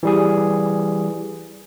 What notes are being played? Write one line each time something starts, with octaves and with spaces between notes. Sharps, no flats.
E3 G3 G#4